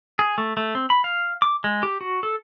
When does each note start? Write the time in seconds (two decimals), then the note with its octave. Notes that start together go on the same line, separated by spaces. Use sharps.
0.19 G#4
0.38 A3
0.57 A3
0.75 C4
0.90 B5
1.04 F5
1.42 D6
1.64 G#3
1.83 G4
2.01 F#4
2.23 A4